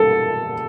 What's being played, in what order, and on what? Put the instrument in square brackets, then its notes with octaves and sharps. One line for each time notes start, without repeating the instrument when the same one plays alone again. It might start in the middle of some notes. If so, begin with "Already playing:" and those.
Already playing: [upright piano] A4